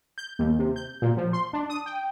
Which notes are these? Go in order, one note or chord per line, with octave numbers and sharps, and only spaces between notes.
G6
D#2
C3
G6
A#2
F3
C6
D4
D#6
G5